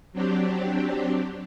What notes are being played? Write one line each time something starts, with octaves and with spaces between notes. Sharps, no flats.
F#3 C4 D4 G4